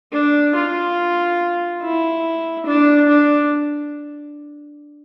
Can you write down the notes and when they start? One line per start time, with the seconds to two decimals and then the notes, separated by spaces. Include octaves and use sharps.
0.13 D4
0.56 F4
1.82 E4
2.66 D4
3.08 D4